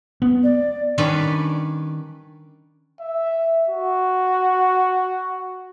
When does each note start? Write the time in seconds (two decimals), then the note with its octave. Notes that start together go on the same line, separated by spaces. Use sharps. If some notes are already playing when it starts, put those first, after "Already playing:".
0.22 B3
0.42 D5
0.98 D#3 G3 C#4 D4 B4 D5
3.00 E5
3.69 F#4